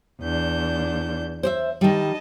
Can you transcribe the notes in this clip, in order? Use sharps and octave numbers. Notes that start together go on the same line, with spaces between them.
E2 D4 G6
C5 D5 E5
D#3 G3 D#5 A5